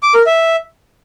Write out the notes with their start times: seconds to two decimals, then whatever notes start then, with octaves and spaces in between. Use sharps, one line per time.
0.03 D6
0.14 A#4
0.26 E5